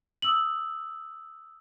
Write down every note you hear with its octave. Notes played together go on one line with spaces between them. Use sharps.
D#6 E6 F#7